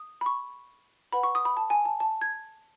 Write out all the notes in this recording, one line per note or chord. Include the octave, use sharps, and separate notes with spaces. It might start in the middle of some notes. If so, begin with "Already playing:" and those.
Already playing: D#6
B5
C#6
B4 F#5 B5
C#6
D#6
B5
A5
G#5
A5
A5
G#6